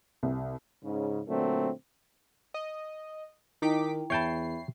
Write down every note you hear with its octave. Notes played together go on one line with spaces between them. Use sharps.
C2
G#2 C#3
A#2 D3 F#3 A3 C4
D#5
D#3 D#4 E4 G5 D6 B6
E2 C#5 E5 G5 A5 B5 C7